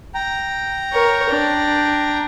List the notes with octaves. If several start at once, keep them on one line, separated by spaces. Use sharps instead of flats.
G5 A#5
A#4 C#5
D4